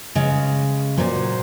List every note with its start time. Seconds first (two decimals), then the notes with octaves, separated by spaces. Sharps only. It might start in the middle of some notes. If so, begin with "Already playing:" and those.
0.15 C#3 G#3
0.97 A#2 F#3 C5